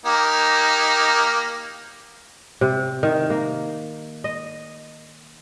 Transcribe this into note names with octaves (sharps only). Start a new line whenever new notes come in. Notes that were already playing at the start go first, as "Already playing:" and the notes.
A#3 D#4 G4
C3
D#3
A#3
D#5